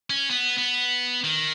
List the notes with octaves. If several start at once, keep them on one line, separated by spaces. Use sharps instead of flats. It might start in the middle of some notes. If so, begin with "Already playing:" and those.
C#4
B3
B3
D#3